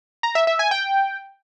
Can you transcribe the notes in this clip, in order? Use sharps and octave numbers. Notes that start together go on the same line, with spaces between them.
A#5
E5
E5
G#5
G5